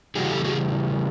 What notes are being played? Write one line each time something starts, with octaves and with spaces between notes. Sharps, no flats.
C#3 E3 G3 F#4 G#4
G4 A4
F#4 G#4